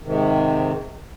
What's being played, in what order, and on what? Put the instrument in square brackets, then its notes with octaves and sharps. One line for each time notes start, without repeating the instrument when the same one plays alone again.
[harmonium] G#2 C3 D#3